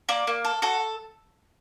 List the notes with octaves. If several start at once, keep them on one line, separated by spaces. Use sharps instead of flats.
A#3 D5
A#3
A4
F#4 A4